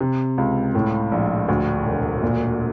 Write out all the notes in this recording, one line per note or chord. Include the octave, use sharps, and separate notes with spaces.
C3
C#2
A2
A#1
D2
E1
A#2